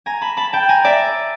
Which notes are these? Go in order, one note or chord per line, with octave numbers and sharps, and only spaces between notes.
G#5 A#5
A5 B5
A5 B5
G5 A5
G#5 A#5
D5 E5